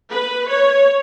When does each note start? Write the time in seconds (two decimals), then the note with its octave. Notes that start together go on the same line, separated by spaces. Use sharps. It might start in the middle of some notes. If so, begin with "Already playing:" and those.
0.11 B4
0.49 C#5